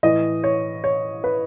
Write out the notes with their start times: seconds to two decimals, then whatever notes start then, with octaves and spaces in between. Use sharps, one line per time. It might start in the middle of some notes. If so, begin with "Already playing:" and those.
0.03 A2 E3 D#5
0.44 C#5
0.84 C#5
1.24 B4